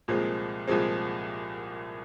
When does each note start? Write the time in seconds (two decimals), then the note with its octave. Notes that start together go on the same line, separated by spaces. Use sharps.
0.08 C2 A#2 F3 G#3 C4
0.68 C2 A#2 F3 G#3 C4